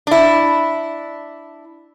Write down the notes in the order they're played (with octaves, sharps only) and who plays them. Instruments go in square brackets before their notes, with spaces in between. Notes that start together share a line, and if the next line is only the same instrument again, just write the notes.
[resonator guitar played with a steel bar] D4 E4